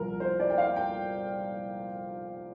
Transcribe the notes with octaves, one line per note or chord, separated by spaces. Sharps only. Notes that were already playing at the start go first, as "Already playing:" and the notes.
Already playing: C2 A#2 F3 A#4
C5
D5
G5
F5
G5